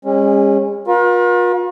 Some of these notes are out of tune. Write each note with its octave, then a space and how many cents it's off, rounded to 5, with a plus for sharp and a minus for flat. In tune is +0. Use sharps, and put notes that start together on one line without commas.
G#3 -40 C#4 -20
F4 +45 A#4 +45